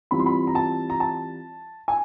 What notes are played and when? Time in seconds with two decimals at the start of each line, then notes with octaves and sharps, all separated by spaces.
0.11 E3 G3 C4 F4 B5
0.19 C6
0.26 B5
0.47 A#5
0.55 A5
0.90 A#5
1.00 A5
1.88 G#5